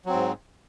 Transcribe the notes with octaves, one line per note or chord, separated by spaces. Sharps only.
G#2 F#3 C4